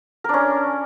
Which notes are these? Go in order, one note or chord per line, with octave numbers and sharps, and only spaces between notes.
C#4 D4 A#4